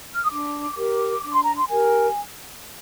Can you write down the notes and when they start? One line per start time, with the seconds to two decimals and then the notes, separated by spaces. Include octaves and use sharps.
0.14 F6
0.22 D#6
0.29 D4 D6
0.75 G4 A#4 D6
1.22 D4 D6
1.33 C6
1.43 A#5
1.54 C6
1.69 G4 A#4 G#5